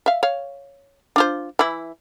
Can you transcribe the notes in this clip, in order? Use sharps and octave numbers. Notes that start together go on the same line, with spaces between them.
E5 F5
C#5 F5
D4 F4 C5
E3 E4